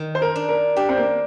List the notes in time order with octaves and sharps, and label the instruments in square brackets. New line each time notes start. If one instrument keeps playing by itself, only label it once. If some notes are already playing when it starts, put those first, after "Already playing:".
Already playing: [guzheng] D#3
[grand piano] C5
A#4
[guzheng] D4
[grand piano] A#4
[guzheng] D4 [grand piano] G4
[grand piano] C4
A#3